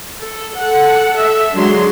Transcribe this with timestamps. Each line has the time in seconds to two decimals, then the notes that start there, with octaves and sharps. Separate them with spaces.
0.22 A4
0.58 A4 F#5
1.16 A4 E5
1.54 D3 F#3 G#3 C6